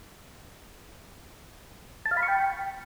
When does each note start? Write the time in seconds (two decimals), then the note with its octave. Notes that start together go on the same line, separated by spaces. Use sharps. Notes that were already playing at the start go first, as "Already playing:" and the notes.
2.06 A5
2.11 F5
2.17 B5
2.23 C#6
2.28 G5